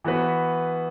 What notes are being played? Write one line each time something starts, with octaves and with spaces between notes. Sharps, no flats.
E3 B3 F#4 B4